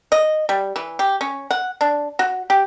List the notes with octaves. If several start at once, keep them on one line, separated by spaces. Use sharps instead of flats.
D#5
G3
E3
G4
C#4
F#5
D4
F#4
G4